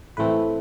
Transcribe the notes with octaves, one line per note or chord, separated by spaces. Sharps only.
A2 E3 A3 C4 B4